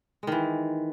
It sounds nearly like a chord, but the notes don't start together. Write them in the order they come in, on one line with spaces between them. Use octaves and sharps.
G#3 D#3 E3